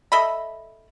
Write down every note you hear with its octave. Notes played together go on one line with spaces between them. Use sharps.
A4 D#5 E5 B5